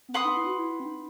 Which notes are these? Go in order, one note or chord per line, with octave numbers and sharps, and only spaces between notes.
B3
C4 B4 F#5 C6 D#6
D#4
E4
F#4
E4
E4
C4
D#4